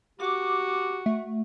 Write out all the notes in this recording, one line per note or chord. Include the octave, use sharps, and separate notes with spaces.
F#4 G4 D6
A3